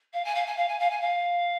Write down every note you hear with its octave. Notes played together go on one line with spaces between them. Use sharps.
F5
G#5
F5
G#5
F5
G#5
F5
G#5
F5